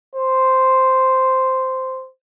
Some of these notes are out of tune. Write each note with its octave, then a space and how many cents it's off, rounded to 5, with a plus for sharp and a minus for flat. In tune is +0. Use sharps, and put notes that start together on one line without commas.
C5 -5